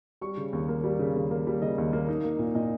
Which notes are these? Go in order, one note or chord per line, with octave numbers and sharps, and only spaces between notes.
G3 C#6
C#3
D#2
A#3
G3
C#3
D#2
A#3
G3
C#3 D#5
D#2
A#3
D#4
A#3
A#2
A#2 D#5